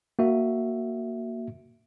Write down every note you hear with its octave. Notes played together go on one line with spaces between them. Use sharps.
A#3 F#4 E5